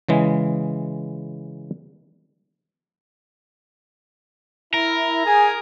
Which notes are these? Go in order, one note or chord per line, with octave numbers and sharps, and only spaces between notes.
C#3 E3 G#3
E4 A#4
G#4 G#5